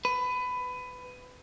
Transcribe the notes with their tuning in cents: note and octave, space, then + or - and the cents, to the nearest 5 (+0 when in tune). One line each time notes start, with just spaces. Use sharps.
B4 +20